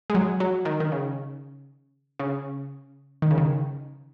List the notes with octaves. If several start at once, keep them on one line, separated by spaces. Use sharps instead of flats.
G#3
F#3
F#3
D#3
D#3
C#3
C#3
D#3
C#3
D#3